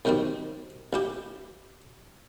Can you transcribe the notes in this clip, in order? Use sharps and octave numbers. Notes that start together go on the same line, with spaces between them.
C2 F#2 D#3 G3 C4
A1 E4 G4